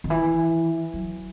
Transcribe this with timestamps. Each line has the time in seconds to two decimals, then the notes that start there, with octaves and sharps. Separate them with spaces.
0.04 D#3
0.10 E3
0.94 F#3